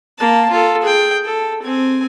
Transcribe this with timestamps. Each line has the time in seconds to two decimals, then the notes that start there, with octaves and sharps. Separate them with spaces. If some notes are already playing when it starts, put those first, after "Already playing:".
0.19 A#3 A5
0.51 F4 A4
0.82 G#4 G5
1.25 A4
1.62 C4 G#5